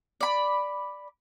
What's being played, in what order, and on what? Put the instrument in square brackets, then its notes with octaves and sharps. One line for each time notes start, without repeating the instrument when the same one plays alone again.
[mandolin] D5 B5